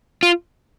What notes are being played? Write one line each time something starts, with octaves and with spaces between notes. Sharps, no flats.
F4